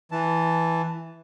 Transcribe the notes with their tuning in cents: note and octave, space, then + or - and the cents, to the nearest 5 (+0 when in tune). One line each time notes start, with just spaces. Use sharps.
E3 +0 A5 +0